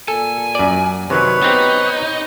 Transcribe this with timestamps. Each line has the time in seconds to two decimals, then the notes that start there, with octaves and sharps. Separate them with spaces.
0.08 A#2 A4 G#5
0.55 F#2 D5
1.10 C3 D#3 F#3 B4 C#5
1.42 B3 C4 D#4 G4